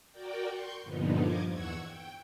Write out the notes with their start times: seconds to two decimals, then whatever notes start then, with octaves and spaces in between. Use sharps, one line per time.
0.11 F#4 A#4 D5 G5
0.50 C6 C#6 G6
0.83 G2 A#2 D3 F3 B3 D#4
1.19 F3 D#5 D6 G#6
1.50 E2 F#5 C#6 E6 G#6
1.85 G5